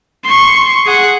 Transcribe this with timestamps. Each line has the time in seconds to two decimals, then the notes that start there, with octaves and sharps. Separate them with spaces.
0.24 C6 C#6
0.86 G#4 F#5